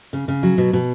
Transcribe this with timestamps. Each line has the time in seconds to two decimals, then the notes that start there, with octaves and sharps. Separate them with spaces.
0.13 C#3
0.28 C#3
0.43 F#3
0.58 B2
0.73 B2